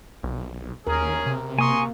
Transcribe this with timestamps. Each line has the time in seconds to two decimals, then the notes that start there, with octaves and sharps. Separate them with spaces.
0.23 B1
0.87 D#2 C#4 G#4 A#4
1.26 C3
1.59 A#3 G#5 A#5 C6 C#6 D#6